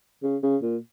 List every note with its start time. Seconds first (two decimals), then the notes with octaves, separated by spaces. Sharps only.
0.23 C#3
0.43 C#3
0.62 A#2